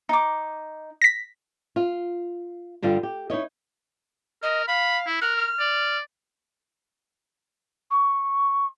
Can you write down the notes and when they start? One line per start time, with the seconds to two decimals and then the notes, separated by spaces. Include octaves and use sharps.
0.09 D#4 D6
1.02 A#6 B6
1.76 F4
2.82 G2 D3 G3 F4
3.03 G4
3.30 D#4 E4 C#5 D#5
4.43 A#4 D#5
4.68 F5 B5
5.06 E4
5.21 A#4 F#6
5.37 F6
5.59 D5
7.91 C#6